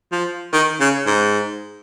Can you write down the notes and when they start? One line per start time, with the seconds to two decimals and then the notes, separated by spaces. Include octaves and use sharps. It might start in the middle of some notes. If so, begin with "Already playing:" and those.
0.12 F3
0.53 D#3
0.80 C#3
1.06 G#2